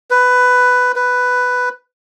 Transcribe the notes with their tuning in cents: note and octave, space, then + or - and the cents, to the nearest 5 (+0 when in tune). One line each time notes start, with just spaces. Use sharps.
B4 +10
B4 +5